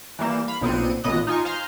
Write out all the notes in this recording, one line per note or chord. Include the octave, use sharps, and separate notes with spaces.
E3 G3 A#3 E7
F5 B5
B1 A#2 B3 C4 C#7 D#7
A1 A#2 B3 D#5 D#6 F#6
D#4 F4 G#5 C#6
C5 F5 G#5 A#5 C6 F6